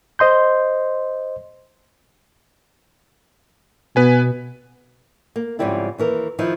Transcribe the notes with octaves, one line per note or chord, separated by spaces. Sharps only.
C5 D#5 C6 G6
B2 B3 B4 G#5
A#3
G#2 C#3 F3 G3 C4 E4
D#2 E3 A#4
D#3 F3 D#4 E4